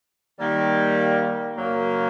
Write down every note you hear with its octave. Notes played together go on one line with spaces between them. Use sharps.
D#3 G3 A#3
F#2 C#3 F#3 A#3